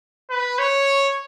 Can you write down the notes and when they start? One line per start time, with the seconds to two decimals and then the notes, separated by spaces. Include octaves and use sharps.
0.30 B4
0.58 C#5